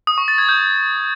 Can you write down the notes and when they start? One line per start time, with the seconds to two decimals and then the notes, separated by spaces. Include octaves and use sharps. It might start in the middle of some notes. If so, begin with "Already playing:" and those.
0.07 D#6
0.18 C#6
0.28 A6
0.38 G#6
0.49 G6